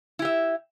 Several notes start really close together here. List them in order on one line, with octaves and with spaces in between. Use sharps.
E4 G4 E5